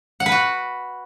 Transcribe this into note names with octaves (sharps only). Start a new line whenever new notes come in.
F#5
B4
F#4